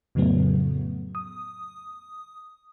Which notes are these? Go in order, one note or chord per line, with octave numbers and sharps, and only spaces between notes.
F2 A2 C#3 F#3 A3 B3
D#6